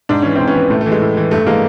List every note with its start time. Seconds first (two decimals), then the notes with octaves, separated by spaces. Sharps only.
0.09 G#2 D4
0.22 E3 C#4
0.36 G#2 C4
0.48 B3 C#4
0.55 E3
0.70 A2 A3
0.81 A3
0.86 E3
0.92 G#3
1.02 A2
1.17 E3
1.31 G2 A3
1.47 E3 G#3 A#3